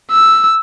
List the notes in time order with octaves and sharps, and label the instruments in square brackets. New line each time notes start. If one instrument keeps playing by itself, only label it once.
[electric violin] E6